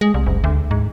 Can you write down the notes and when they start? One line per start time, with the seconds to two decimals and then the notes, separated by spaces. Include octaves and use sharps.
0.01 G#3
0.14 C2
0.27 F#1
0.44 D2
0.71 G#2